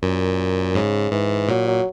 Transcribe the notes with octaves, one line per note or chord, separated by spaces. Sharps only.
F#2 A#2
G#2 C#3
G#2 E3
A#2 F#3
F#3